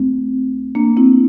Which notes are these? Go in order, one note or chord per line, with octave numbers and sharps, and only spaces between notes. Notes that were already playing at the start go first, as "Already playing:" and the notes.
Already playing: D2 A3 C4
A#3 D4
C4 E4